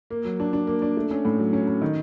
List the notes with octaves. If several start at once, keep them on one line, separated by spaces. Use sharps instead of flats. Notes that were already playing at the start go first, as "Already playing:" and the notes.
A#3
F#3
D4
D4
A#3
D4
A3
C#4
A2
F#3
C#4
C#4
D#3